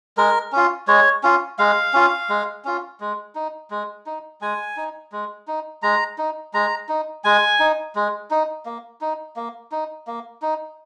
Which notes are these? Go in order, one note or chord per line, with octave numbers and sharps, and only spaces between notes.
G#3 A#4
C#4 F4
G#3 C#5
C#4 F4
G#3 F5
C#4 F4
G#3
C#4 F4
G#3
D#4
G#3
D#4
G#3 G#5
D#4
G#3
D#4
G#3 A#5
D#4
G#3 A#5
D#4
G#3 G#5
D#4
G#3
D#4
A#3
D#4
A#3
D#4
A#3
D#4